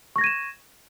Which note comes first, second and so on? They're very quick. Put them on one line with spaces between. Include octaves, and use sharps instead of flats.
C#6 A#6 G#6 D#7 E7